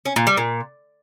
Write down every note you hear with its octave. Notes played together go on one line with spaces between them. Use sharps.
C#4
A#2
G3
A#2